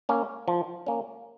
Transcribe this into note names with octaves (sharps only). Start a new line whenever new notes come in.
A#3 C#4
F3
A#3 C#4